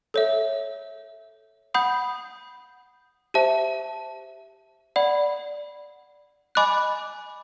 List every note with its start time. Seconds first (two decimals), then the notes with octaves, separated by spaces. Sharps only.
0.14 A4 C#5 E5
1.74 F#5 B5 D#6 G6
3.34 G4 C5 E5 A5
4.96 D5 F#5 B5
6.55 D#5 G#5 B5 D6 F#6